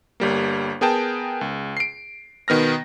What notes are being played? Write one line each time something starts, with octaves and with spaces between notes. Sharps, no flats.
G1 G3 A#3
B3 G#4 A#4 G5 A5
C#2
C7 D7
B2 D#3 B3 F6 A#6